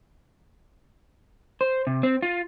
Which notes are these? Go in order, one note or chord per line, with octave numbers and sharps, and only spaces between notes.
C5
C3
C4
F4